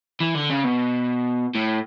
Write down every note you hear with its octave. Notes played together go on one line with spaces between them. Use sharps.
E3
D3
C#3
B2
A2